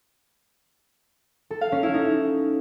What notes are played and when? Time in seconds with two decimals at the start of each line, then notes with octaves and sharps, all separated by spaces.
1.51 A4
1.61 F5
1.72 C#4
1.83 E4
1.94 D#4